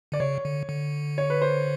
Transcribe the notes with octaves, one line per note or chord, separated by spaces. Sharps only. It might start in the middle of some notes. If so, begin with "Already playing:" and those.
D3 D5
C#3 C#5
D3
D3
C#5
B4
C5